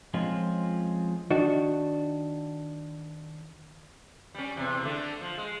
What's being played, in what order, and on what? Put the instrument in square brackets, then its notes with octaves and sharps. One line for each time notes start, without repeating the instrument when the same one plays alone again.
[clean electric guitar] F3 G#3 C4 C#4 F4
[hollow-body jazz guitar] D#3 D4 F#4
[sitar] G3 C#4
E2 C3
D3 A3
F3
G#3